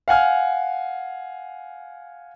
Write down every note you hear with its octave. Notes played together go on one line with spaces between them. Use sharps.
F5 F#5 G#5 F6